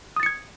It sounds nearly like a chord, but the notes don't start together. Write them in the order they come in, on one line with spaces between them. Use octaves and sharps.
D#6 A6 C#7 G#6